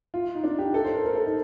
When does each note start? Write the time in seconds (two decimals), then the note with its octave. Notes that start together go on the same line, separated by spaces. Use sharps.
0.14 F4
0.34 D#4
0.44 D4
0.59 G4
0.74 A4
0.85 C5
0.94 A#4
1.05 A#4
1.15 A4
1.25 D#4